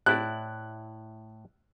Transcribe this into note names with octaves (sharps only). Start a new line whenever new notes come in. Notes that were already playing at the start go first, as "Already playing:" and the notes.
A2 E4 D5 F#6